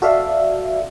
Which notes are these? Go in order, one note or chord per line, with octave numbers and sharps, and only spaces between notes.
F#4 A4 D5 E5 F5